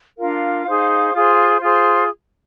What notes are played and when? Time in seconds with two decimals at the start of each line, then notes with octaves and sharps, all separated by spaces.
0.19 D4 F4 A#4 F5
0.66 D#4 G#4 C5
1.14 F4 G#4 C5
1.61 F4 G#4 C5